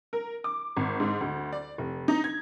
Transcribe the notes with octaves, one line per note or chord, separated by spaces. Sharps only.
A#4
D6
G#1
G#2
D2
D5
F1
D#4
G#6